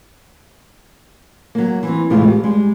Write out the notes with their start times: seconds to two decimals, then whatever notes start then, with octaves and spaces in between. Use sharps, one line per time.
1.55 F#3 A#3
1.83 E3 C4
2.10 A2 C3 E3 G#3 A3 F4
2.28 G4
2.44 G3 G#3